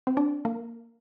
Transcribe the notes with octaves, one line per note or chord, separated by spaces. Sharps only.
C4
D4
A#3